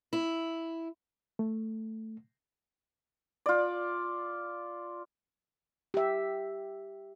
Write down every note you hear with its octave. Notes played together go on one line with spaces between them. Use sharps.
E4
A3
F4 D5
G4 E5